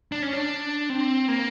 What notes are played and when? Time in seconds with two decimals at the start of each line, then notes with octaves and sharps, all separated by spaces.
0.12 D4
0.22 C#4
0.33 D4
0.90 C4
1.28 A#3